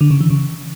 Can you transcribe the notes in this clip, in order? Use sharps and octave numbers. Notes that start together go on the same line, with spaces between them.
D3
C#3
E3
C#3